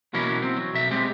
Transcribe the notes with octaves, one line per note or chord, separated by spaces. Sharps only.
B2 E3 F#3 A#3 C#4 E4
C4
F#3
B1 E5
G#3 C4 G4